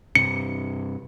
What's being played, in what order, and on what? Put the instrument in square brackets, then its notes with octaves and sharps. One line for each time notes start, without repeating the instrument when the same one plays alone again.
[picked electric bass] G2 C3 [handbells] C#7